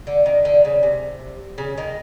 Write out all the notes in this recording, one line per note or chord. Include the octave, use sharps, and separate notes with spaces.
D3
D#3
D3
C#3
C3
C#3
D#3